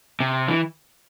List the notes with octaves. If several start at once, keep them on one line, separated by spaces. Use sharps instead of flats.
C3
E3